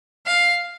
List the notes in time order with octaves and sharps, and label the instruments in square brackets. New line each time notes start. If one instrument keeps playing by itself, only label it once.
[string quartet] F5